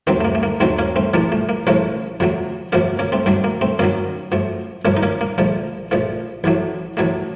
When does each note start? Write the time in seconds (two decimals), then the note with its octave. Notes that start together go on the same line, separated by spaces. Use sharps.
0.07 D#2 D#3 F#3 A3 C4
0.21 A3
0.25 A#3
0.35 A3
0.43 A#3
0.60 D#2 D#3 F#3 A3 C4
0.79 A#3 C#4
0.96 A3 C4
1.14 A#1 A2 F3 A3 A#3
1.32 A3
1.49 A#3
1.67 A#1 A2 F3 A3 A#3 C#4
2.20 F2 C3 F#3 A3
2.72 F2 C3 F#3 A3 A#3 C#4
2.99 A#3 C#4
3.12 A3 C4
3.26 F#2 D#3 F#3 A3
3.44 A#3
3.61 A3 C4
3.79 F#2 D#3 F#3 A#3 C#4
4.32 F#2 F3 A3
4.85 F#2 F3 A3 A#3 C#4
4.97 D#4
5.03 A#3 C#4
5.21 A#3
5.38 A#1 A#2 F3 A3
5.91 A#1 A#2 F3 A3
6.44 A1 A2 F#3 A3
6.97 A1 A2 F#3 A3